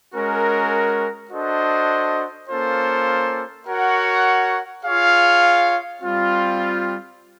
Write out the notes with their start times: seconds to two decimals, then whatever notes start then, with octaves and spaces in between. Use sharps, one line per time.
0.14 G#3 C#4 F#4 A#4
1.31 D4 F#4 A4 C5 D#5
2.48 A#3 C#4 F4 A4 C5
3.66 F#4 A#4 C#5 F#5
4.84 F4 G#4 C#5 F5
6.01 G3 C4 F4